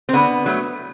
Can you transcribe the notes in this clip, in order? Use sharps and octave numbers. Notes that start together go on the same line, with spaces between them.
C4
D3 B3
F#3 A3